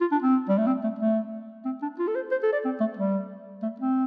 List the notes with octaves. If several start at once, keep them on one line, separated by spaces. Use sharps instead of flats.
F4
D4
C4
G3
A3
C4
A3
A3
C4
D4
F4
A4
C5
C5
A4
D5
C4
A3
G3
A3
C4